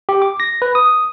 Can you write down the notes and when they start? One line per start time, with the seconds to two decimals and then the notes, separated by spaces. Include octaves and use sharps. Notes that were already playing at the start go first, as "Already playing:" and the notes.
0.09 G4
0.22 D6
0.40 A#6
0.62 B4
0.75 D#6